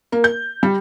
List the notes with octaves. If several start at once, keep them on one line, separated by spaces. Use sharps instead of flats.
A#3
G6
G3